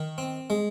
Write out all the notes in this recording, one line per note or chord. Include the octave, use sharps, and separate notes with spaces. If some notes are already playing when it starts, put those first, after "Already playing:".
Already playing: D#3
C4
G#3